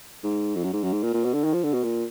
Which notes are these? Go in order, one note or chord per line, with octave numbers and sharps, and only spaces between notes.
G#2
F2
F#2
G#2
F#2
G#2
A#2
A#2
B2
D3
D#3
F3
D3
B2
A#2